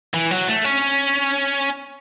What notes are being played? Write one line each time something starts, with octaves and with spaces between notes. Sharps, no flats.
E3
F#3
A3
C#4